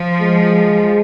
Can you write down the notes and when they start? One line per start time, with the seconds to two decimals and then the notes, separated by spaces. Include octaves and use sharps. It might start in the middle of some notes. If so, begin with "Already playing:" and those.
Already playing: F3
0.21 G#3